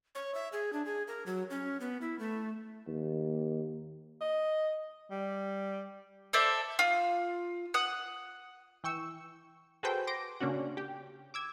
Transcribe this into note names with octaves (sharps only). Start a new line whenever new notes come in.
C#5
E5
G#4
D4
G#4
A#4
F#3
C#4
B3
E4
A3
D#2
D#5
G3
A4 C5 D5 E5
F4
F#5 D#6
E3 G5 C#6 E6
F#4 G#4 A4 B4 C5 G5
C6 D6 A#6 D7
C#3 A#3 C#4 D4 F#4
G4 G5
D6 E6 G#6